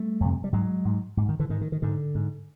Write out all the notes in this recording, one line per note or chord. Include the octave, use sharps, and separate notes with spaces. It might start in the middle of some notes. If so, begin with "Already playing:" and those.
Already playing: G3 A3
F2 C3
G3
G#2 F#3 G#3
G#2
G#2
D#3
D3 E3
G#2 D#3
D#3
D#3
G#2 D3
G#2